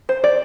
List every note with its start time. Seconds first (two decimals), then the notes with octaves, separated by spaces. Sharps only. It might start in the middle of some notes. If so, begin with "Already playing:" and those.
0.09 C5
0.24 D5